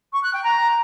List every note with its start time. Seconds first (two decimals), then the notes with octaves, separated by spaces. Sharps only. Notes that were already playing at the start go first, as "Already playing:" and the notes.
0.13 C#6
0.23 F#6
0.33 G5
0.44 A#5